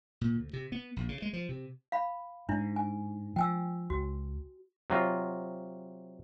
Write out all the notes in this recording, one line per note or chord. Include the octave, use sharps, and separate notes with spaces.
A#2
D2
C3
B3
A#1
C#3
G#3
F3
C3
F5 B5
G#2 D4 E4
G#5
F3 G5 G#5 E6
C#2 F#4
C3 F#3 F4